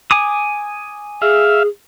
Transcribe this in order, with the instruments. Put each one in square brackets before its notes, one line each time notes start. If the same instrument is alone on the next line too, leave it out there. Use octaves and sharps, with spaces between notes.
[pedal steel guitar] G#5 D6 D#6
[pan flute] G#4 [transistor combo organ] E5 F5